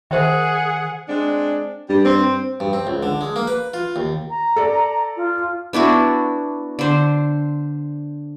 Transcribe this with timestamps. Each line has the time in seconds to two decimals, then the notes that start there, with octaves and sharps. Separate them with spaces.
0.11 D#3 G#4 A#4 C5 E5 F#5
1.08 G#3 C4 D4
1.89 G2 G3 G4
2.04 C4
2.60 G2
2.73 C4
2.87 C#2
3.03 D3
3.21 G#3
3.36 A#3
3.47 B4
3.74 F4
3.96 D#2
4.30 A#5
4.56 A4 D5
5.17 F4
5.73 B3 D4 E4 F#4
6.79 D3 C5